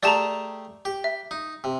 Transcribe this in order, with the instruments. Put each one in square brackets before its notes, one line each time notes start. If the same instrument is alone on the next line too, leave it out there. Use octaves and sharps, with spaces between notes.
[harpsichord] A3 G4 G#4 [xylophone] D5 A5 A#5
[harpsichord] G4
[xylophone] E5
[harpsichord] D#4
C3